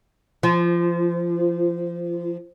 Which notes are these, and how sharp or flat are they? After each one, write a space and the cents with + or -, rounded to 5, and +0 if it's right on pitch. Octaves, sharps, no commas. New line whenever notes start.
F3 -20